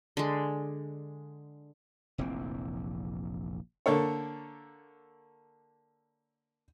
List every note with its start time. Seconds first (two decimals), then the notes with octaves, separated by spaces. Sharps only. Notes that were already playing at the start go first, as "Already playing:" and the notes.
0.17 D3 G#3
2.18 F1 A#1 E3 C4
3.86 D3 A#3 A4 C#5